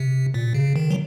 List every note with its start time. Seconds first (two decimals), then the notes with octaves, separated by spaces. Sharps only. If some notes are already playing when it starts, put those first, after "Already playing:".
Already playing: C3
0.34 A#2
0.54 C#3
0.76 D#3
0.91 F#3